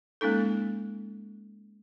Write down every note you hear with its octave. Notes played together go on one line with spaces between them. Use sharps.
G#3 A#3 C#4 D#4 A4